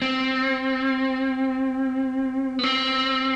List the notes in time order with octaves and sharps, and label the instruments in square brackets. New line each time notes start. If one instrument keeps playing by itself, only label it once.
[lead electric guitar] C4
B3
C4